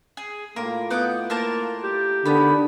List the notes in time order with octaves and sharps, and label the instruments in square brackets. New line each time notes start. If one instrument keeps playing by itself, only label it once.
[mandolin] G#4
[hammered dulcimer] A2 F4 [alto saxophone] A#3 [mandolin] A#4
[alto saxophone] B3 [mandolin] D#4 F#5 D6
[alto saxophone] A#3 [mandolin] A#4 C5 A5
[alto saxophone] G4
[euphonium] D3 [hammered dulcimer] D#3 D#5 A5 [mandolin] B3 B5